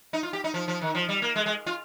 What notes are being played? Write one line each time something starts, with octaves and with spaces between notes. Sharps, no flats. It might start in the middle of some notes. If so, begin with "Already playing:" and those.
D#4
F4
G4
D#4
F3
F3
D#3
F3
G3
A#3
G#3
G#3
F4